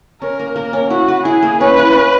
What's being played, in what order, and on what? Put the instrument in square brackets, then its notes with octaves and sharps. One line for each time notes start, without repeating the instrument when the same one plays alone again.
[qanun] C#4 [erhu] A#4
[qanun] A#3
[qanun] A#3 [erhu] A#4
[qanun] C#4
[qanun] E4 [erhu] F#4
[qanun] B4
[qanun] E4 [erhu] G#4
[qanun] A#3
[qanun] C#4 [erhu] B4
[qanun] E4
C#4